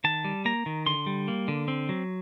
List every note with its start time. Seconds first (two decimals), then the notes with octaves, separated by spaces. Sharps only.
0.04 D#3 A5
0.25 G3
0.45 A#3 A#5
0.66 D#3
0.86 D3 C6
1.06 G3
1.28 A#3
1.48 D3
1.68 C4
1.89 F#3